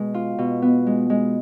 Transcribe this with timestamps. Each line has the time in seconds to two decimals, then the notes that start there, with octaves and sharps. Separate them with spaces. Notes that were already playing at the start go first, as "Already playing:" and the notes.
Already playing: B2 G#3
0.14 F4
0.38 B2
0.62 B3
0.87 G#3
1.10 G#3